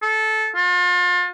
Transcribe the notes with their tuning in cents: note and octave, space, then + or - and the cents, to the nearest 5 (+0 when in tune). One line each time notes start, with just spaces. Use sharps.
A4 -15
F4 +35